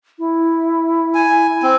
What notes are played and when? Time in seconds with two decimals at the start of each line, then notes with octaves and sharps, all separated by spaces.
0.19 E4
1.15 G#5
1.63 C4